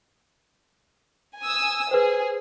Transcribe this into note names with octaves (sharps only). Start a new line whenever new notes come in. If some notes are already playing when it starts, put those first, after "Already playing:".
G#5 D#6 E6
G#4 B4 C5